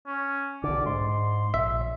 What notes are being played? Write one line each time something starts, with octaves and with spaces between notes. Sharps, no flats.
C#4
B1 D3 D5
G#2 C6
A#1 E5